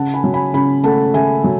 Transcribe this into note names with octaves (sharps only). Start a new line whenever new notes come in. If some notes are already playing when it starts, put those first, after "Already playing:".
Already playing: C#3 F#5 A5
G#5 B5
F#3
G#5 B5
C#3 G#5 B5
A3 F#5 A5
C#3 E5 G#5
F#3